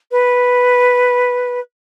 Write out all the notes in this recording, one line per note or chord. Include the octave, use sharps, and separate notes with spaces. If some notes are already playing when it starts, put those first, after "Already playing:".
B4